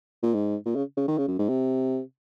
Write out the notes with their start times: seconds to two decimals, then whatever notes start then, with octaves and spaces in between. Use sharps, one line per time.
0.23 A#2
0.34 G#2
0.66 A#2
0.76 C#3
0.97 C#3
1.08 D#3
1.18 C#3
1.28 F#2
1.39 G#2
1.49 C3